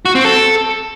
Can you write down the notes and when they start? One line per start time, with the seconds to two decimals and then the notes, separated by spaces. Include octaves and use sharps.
0.05 F#4
0.15 C4
0.25 A4